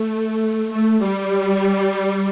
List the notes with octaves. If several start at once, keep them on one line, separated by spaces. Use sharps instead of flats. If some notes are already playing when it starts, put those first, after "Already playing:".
Already playing: A3
A3
G3